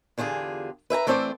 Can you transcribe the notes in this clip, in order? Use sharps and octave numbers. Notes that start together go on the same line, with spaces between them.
E2 D3 F4 G4 G#4
B4 E5 G5 A#5
E3 A3 C4 A4 C5 D5